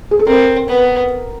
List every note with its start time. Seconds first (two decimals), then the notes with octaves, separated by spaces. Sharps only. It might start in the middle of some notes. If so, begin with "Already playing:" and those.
0.11 G#4
0.19 A4
0.27 C4 A#4
0.69 B3